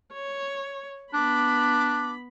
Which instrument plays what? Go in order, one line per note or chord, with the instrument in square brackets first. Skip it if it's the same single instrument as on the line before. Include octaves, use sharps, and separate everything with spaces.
[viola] C#5
[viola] B3 B5 [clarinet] D4 [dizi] D6